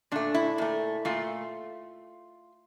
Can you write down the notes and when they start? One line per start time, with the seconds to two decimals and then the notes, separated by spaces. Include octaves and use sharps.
0.12 A#2 A3 D4
0.34 E4
0.58 A#2 A3
1.05 A#2 A3 F4